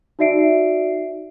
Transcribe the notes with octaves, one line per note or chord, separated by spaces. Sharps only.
D#4 F#4 D5 E5 C7 D7